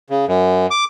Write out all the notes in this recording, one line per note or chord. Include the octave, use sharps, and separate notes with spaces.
C#3
F#2
D6